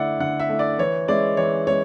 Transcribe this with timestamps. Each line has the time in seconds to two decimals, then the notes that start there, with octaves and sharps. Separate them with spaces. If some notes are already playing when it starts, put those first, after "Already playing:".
Already playing: D3 A3 E4 D5 F#5
0.20 D3 F#5
0.39 E5
0.49 A3 E4
0.59 D5
0.79 E3 C#5
1.08 G#3 C#4 E4 D5
1.37 E3 C#5
1.67 G#3 C#4 C#5